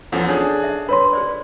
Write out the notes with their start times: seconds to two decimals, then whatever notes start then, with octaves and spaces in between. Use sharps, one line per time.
0.12 E2 F3 C#4 A4 F#5
0.29 D4 D#4 G#4 A4 C#5
0.64 E5
0.89 D4 A#4 B4 C#5 B5 C6
1.13 G#4 C5 D5